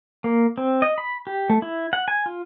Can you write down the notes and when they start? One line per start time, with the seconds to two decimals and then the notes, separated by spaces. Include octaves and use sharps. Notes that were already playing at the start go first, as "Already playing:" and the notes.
0.24 A#3
0.58 C4
0.82 D#5
0.98 B5
1.27 G4
1.50 A3
1.62 E4
1.93 F#5
2.08 G#5
2.26 F4